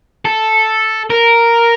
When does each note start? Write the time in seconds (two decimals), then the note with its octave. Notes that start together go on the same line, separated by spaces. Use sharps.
0.25 A4
1.10 A#4